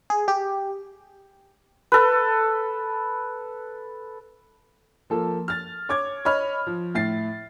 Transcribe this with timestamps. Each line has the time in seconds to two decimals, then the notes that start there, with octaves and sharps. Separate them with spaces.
0.10 G#4
0.28 G4
1.92 A4 B4
5.10 F3 A#3 A4
5.48 F6 A6
5.89 C#5 D6 G#6
6.25 C#5 D#5 B5 F6
6.67 F3
6.95 A2 E4 A6 C7